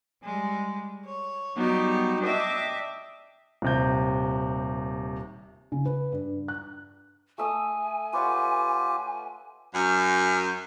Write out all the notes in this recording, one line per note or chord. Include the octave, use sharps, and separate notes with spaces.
G3 G#3
C#5
F#3 G3 B3 D#4 G4
D4 D#5 E5 G5 D6
D#1 C3 G6
C#3
B4
G2
F#6
A3 E5 G#5 D#6
F4 G4 B4 C#5 F#5
F#2